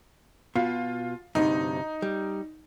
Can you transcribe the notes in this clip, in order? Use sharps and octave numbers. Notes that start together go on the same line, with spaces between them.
B2 F4
D2 G2 C3 D#4
G3